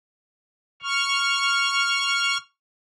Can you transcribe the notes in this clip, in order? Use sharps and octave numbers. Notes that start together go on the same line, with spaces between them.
C#6 F6